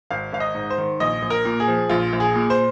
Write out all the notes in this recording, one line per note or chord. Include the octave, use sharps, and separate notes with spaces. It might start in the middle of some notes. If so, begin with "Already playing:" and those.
G#1 F5
G#1 F5
D#5
G#2
C5
D#3
A#1 D#5
A#1
A#4
A#2
G#4
F3
A#1 F4
A#1
G#4
A#2
C5